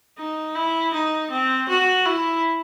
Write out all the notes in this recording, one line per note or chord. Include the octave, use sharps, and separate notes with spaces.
D#4
E4
D#4
C4
F#4
E4